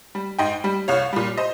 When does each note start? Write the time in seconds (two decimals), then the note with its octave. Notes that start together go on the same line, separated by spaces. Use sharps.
0.15 G3
0.39 G#2 D#5 G5
0.64 G3
0.88 C2 C#5 F5
1.13 A#2 G3
1.37 C5 D#5